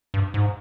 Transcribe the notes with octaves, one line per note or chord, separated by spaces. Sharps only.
G2
G#2